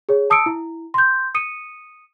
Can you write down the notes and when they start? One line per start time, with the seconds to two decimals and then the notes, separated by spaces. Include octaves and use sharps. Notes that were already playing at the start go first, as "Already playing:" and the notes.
0.09 G#4 C#5
0.30 A5 D#6 E6 C#7 D7
0.46 E4
0.94 C6 G6
1.35 D#6 C#7 D#7